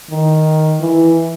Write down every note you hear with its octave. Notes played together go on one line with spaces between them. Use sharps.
D#3
E3